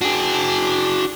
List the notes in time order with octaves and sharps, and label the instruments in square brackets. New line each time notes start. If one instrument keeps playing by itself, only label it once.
[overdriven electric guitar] D4 [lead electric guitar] F#4 G#4